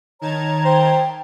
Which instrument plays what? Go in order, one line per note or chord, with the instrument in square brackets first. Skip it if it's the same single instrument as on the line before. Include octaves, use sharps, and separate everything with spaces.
[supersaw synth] D#3 A5 G#6 [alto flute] C#5 [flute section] A#5
[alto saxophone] C5 [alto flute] G5